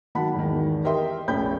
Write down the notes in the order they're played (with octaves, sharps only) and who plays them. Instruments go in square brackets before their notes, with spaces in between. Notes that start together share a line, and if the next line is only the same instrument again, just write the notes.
[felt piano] D#3 F#3 F#5 A5 B5
G#1 E2 D#3
G4 A#4 D#5 E5 G5 C6
F1 A#1 C#4 G5 B5 G6